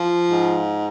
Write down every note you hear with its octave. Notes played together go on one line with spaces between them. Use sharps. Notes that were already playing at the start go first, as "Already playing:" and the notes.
Already playing: F3
G#2